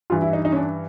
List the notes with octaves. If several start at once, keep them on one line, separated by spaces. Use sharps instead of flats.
G2 E3 F4
E4
D#4
D#4
C#4
D4